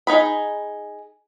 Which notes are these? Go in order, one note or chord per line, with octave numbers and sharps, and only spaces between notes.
D#4 G#4 B5